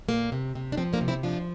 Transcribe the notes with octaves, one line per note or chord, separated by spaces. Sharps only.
A#2 A#3
C3
C3
D4
F3 C4
A#3 D4
C3
C4 E4
F3 D4 F4